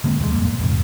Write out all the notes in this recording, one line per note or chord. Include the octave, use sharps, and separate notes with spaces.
D3 G#3 A#3 C4
D#2 B2 E3 G#3
G#1 F2 G3 A#3
A#2
E2 G#2 C3